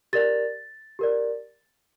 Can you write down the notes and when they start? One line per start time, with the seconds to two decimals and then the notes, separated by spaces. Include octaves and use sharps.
0.13 G4 A#4 D5 A6
0.99 G4 A#4 D5